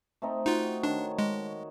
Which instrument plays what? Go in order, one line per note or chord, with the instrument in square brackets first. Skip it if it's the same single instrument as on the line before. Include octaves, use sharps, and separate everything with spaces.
[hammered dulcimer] A3 C4 D#4
[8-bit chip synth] D#4 F4 [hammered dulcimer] F#4
[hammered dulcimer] D#3 C#5 A5 [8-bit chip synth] D4
[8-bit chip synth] G#3